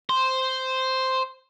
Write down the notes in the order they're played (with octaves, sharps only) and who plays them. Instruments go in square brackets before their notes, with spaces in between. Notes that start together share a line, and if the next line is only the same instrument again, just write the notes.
[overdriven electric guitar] C5